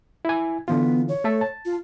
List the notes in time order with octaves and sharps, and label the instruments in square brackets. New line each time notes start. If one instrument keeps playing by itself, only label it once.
[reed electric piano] E4 G#5
[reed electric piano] D3 E3 F4 [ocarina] B3
[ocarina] C#5
[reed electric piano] A3 A4 E5
A5
[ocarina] F4